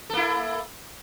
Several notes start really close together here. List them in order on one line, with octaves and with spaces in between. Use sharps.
A4 A#3 E4